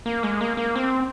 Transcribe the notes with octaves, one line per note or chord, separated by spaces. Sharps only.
A#3
G#3
A#3
A#3
C4